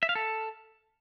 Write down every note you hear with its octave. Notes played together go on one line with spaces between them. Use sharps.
E5
F5
A4